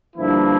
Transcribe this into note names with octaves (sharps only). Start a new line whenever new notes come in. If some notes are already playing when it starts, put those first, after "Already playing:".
G2 D3 F3 A#3 E4